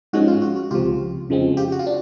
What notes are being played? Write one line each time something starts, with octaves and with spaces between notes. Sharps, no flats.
G#2 F3 G#3 C#4 F#4
F4
F#4
F#4
C#2 C3 F3 F4 G4
F2 C#3 F3 G#3 C4
F4 G4
F#4
F4
D4